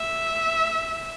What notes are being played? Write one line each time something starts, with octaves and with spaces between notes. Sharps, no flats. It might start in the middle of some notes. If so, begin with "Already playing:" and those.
Already playing: E5